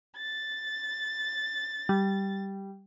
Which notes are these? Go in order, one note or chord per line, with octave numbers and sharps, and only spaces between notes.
A6
G3